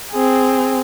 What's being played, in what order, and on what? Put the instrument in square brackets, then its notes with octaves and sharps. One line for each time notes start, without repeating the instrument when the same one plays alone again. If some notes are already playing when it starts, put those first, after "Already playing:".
[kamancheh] C4 G#4